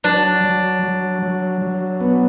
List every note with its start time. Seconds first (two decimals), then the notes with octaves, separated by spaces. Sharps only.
0.04 F#3 D4
0.44 F#3
0.83 F#3
1.22 F#3
1.62 F#3
2.00 B3